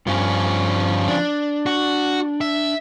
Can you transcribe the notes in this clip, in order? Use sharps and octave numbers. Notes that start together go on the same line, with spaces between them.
G2 F3 C#4
D4
F#4
E5